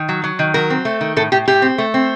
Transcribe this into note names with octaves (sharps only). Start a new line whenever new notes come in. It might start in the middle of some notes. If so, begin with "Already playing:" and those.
Already playing: D#3
F#3
F#3
D#3
F#3 A#4
C4
A3
D#3
A2 A4
A2 G4
A2 G4
C4
A3
C4